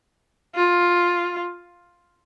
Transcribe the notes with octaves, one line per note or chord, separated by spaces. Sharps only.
F4